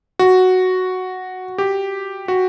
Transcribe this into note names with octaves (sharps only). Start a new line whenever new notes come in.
F#4
G4
F#4